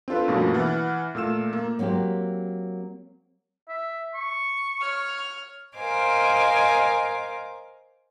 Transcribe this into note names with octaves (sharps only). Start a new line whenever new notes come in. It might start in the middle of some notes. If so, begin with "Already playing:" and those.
C4 D4 F4 A4 B4
G2 B2 F3 A3 A#3 C#4
E3 F#5 F6 A6
A#2 A3 E6 E7
A#3
F#3 A#3 C4 F#4 G4
E5
C#6
C#5 F6
A#4 C5 D#5 F5 G#5 D6